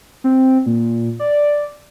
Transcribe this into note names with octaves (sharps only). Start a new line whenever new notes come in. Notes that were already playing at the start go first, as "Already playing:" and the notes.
C4
A#2
D5